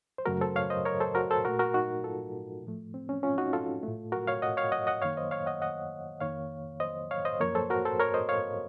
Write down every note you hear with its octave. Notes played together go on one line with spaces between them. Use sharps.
C5
F#2 C#3 F#3 A3 F#4 A#4
A4 C5
C#5 F5
C5 D#5
A#4 C#5
A4 C5
F#4 A#4
A4 C5
A#2 A3 F#4 A#4
F#4 A#4
D#4 F#4
F4 A4
A2 F3 A3
C4
C#4
C#4 F4
D#4 F#4
F4 A4
A2 A3
F#4 A#4
C#5 F5
D#5 F#5
C#5 F5
D#5 F#5
D#5 F#5
F#2 D#3 A#3 C#5 F5
C5 D#5
C#5 F5
D#5 F#5
D#5 F#5
F2 D#3 A#3 C#5 F5
C5 D#5
C#5 F5
C5 D#5
F#2 F3 A#3 A#4 C#5
A4 C5
F#4 A#4
A4 C5
A#4 C#5
C5 D#5
C#5 F5